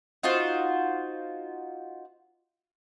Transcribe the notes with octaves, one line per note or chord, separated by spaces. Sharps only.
D#4 F4 F#4 C5